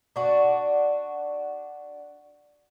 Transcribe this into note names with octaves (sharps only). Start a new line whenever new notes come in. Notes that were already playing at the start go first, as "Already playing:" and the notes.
D4 F#4